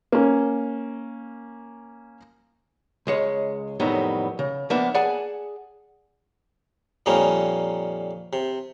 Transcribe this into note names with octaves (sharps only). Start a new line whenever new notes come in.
A#3 C#4
C#2 G#3 C#5
F2 A2 D#3 F#3 G3 B3
C#3
F3 A#3 B3 D4 E5
G#4 D5 F#5 G#5 A5
F2 A#2 G3 A#3 C#4 D#4
C3